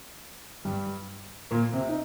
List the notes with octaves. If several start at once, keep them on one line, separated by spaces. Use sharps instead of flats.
G2 G3
A#2 A#3
C3 C4
D#4